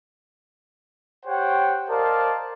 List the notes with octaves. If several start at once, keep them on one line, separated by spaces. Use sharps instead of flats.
G4 C5 C#5 F#5 G5
A#4 C5 D5 D#5 F5 A5